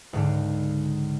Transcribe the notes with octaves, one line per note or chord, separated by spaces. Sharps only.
C#2 G#2 D3